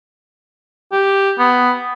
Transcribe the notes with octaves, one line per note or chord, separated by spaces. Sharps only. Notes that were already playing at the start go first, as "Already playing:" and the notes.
G4
B3